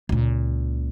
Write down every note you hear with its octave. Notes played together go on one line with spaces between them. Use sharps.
C#2 A#2